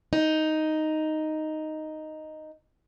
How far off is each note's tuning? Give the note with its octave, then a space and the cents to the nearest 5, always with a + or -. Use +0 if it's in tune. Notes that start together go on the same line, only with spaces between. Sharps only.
D#4 +0